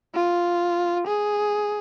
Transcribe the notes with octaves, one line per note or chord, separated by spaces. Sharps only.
F4
G#4